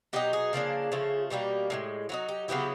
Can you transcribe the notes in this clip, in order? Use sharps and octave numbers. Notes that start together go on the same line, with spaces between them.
B2 F#3 B3 D#4 G4
G#4
C#3 F3 A#3 D4
C#3 F3 A3
B2 G3 A#3 G4
A2 F3 G#3
F#3 A#3 D#4 F#4
G4
C#3 F#3 B3 E4 G4